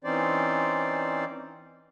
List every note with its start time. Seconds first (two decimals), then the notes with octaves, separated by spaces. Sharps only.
0.04 E3 C4 C#4 D#4 C5 D5